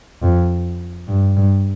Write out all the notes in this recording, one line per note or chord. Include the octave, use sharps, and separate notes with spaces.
F2
G2
G2